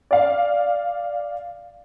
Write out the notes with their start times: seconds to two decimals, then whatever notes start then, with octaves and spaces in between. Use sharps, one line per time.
0.11 D5 F5